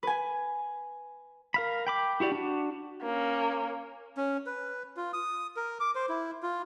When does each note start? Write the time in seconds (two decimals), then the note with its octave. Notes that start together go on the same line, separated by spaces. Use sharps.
0.03 B4 G#5
1.54 A#4 F5 B5
1.87 G5 B5 D6
2.20 E4 F#4 G4 D5
2.32 D4 F#4
3.02 A#3 C#4
4.17 C#4
4.46 B4
4.97 F4
5.13 D#6
5.57 A#4
5.80 D6
5.95 C5
6.09 E4
6.43 F4